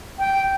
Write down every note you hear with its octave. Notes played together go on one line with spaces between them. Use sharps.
G5